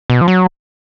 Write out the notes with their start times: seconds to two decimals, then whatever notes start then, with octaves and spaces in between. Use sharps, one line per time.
0.10 B2
0.21 F3
0.28 F#3